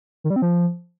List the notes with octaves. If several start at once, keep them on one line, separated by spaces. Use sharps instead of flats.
D#3
G3
C4
F3